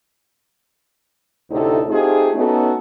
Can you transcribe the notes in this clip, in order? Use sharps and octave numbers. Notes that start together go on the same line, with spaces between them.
D2 A2 C3 D#4 A4
A3 C4 D#4 F4 G4 G#4
A3 B3 C#4 D#4 F#4 A4